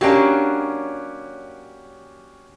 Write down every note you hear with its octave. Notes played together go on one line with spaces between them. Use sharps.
F#3 A#3 C#4 D4 G4